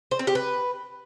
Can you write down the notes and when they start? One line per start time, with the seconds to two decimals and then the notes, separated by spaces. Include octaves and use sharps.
0.11 C5
0.19 C4
0.27 G4
0.35 B4